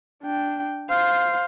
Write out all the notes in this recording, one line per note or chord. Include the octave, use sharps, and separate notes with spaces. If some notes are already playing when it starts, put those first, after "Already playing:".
D4 G5
C5 F5